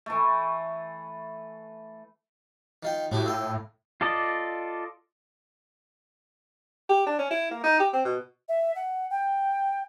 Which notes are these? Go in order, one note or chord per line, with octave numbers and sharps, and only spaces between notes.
E3 A3
D#3 F4 G5
A2 A3 F#4 G4
F4 G5 E6
F4 A4 D5 D#5
G4
D4
C#4
E4
A#3
D#4
G4
C4
B2
E5
F#5
G5